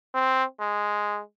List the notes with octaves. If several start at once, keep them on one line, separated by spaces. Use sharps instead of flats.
C4
G#3